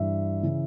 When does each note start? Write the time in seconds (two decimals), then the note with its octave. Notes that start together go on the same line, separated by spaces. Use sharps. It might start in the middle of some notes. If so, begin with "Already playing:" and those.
Already playing: G2 E3 E5
0.43 C#3 E3